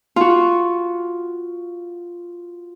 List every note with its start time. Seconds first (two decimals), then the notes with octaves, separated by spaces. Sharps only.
0.16 F4 F#4